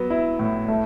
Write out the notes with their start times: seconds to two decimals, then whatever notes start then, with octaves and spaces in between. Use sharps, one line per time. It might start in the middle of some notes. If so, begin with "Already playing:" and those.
Already playing: F#3 B3
0.10 E4
0.39 A2
0.68 A3